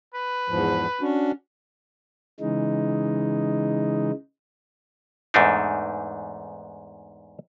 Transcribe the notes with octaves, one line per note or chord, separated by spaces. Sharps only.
B4
E2 G#2 F3
C#4 D4 F#4
C#3 E3 G#3 D#4
E2 G#2 A3 D4 D#4